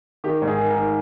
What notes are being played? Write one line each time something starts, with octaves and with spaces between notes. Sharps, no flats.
D#3 G4
G#2
G#4
D#3
A#4
D#3